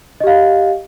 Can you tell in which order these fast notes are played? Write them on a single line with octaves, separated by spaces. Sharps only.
D#5 G4 F5